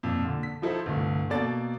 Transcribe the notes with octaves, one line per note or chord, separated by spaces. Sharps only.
F2 A#2
A#2 D3
B6
F3 D#4 E4 A4 C5
G1 C2 A3
B2 A#3 A4 D5 A6